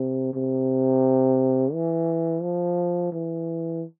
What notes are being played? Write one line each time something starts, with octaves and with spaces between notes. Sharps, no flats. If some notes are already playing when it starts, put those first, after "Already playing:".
Already playing: C3
C3
E3
F3
E3